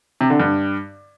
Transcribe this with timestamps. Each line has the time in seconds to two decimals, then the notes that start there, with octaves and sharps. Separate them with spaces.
0.21 C3
0.30 D3
0.40 G2